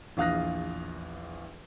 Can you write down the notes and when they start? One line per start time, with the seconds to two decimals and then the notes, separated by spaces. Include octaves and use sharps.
0.17 A#1 E2 F5 D#6 F#6 A#6